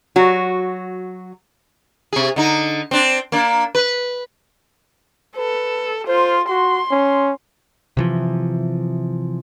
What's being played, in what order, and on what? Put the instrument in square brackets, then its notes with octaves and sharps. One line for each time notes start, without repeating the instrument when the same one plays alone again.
[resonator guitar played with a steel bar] F#3 F#4
[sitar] C3 G#4
D3 D#4
C4 D4
A#3 D4
B4
[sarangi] A4 [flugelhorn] B4
[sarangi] F4 [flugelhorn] C5
[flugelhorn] F#4 [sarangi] C6
[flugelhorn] C#4
[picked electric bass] C3 E3 F3